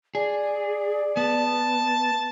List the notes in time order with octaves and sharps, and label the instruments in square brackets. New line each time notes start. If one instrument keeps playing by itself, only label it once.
[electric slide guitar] G#4 [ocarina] D5
[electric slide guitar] B3 [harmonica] A5